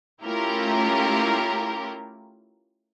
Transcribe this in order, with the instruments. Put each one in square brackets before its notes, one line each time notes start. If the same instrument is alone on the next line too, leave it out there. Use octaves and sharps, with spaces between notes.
[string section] A3 C#4 E4 F4 G4 A#4